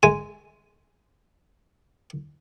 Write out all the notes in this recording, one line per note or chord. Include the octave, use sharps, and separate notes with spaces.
G#3 G#5